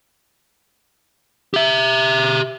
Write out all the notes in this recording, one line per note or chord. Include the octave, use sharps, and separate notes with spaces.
G4 E5